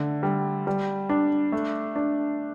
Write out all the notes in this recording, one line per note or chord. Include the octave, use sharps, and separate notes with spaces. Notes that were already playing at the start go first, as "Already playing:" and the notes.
Already playing: D3 A3
G3
G3
D4
A3
D4